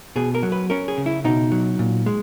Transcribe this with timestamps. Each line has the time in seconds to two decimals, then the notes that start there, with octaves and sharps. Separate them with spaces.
0.16 B2 G#4
0.35 A#4
0.43 F#3
0.52 B4
0.70 C#4 A#4
0.88 G#4
0.98 C#3
1.06 E4
1.24 B2 D#4
1.52 F#3
1.79 A#2
2.06 G#3